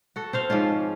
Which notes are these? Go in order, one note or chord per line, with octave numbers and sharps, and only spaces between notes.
F#4 A4
C4 C5 F5
G#2 F3 C#4 F4